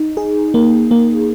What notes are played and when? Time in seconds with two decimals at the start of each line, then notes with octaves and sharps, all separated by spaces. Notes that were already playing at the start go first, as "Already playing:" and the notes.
Already playing: D#4
0.17 G#4
0.54 A#3
0.91 A#3